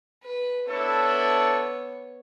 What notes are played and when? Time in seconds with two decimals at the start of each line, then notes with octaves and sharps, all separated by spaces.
0.23 B4
0.68 B3 D4 E4 A4 C#5